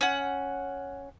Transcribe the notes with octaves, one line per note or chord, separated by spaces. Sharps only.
C#4 F#5